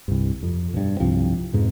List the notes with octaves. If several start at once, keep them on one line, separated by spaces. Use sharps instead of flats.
C2 G2
F2
G2 B2
C2 G2 F3 C4
F2 G#2 B2